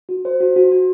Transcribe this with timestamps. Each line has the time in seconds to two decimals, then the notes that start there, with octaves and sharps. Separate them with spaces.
0.09 F#4
0.25 C5
0.40 F#4
0.56 F#4
0.72 F#4